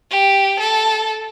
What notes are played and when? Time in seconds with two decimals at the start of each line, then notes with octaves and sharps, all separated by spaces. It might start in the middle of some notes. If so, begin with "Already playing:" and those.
0.11 G4
0.60 A4